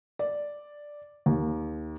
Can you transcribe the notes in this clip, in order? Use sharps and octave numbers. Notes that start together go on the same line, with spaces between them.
D5
D#2